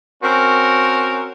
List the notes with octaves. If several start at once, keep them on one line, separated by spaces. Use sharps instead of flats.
C4 C#4 F#4 A#4